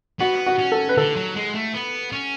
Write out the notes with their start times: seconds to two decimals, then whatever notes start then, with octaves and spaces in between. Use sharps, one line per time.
0.20 B3 F#4
0.47 F#4
0.59 C#4
0.72 A4
0.89 B4
0.97 D3 A4
1.16 F#3
1.36 G#3
1.55 A3
1.74 B3
2.12 C#4